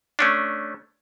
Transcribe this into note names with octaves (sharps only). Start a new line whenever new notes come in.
A3 C#4 D4